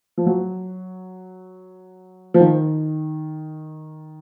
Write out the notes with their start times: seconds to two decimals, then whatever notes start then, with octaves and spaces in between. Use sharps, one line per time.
0.17 F3
0.26 F#3
2.34 F3
2.40 D#3